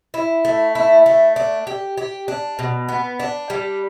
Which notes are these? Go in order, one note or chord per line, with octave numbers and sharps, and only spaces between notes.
E4
A3
E4
A3
D4
G4
G4
D4
B2
B3
D4
G3